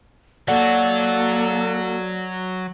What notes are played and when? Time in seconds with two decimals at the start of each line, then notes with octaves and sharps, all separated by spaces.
0.48 F#3 A#3 F#4 A4 D5 F#5